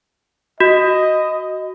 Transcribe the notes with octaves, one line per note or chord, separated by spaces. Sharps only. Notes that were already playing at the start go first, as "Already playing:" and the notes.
F#4 D#5